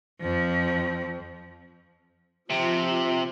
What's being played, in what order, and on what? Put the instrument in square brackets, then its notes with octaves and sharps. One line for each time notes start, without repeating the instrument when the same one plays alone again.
[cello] F2 F3
[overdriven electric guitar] C3 [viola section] F3